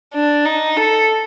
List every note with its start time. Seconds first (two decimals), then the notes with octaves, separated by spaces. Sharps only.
0.14 D4
0.45 D#4
0.77 A4